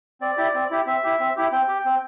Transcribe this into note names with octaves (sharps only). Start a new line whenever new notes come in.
C4 D5
E4 G4
C4
E4 G4
C4 E5
E4 G4
C4
E4 G4
C4 G5
G4
C4